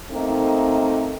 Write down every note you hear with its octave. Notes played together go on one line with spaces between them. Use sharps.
A3 A#3 C4 D#4